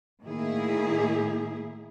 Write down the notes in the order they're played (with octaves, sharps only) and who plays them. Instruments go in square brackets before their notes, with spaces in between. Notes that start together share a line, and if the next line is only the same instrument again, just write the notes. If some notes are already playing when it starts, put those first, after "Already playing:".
[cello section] A2 D#3 A#3 E4 G#4